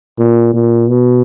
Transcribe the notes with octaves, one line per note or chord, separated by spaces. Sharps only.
A#2
A#2
B2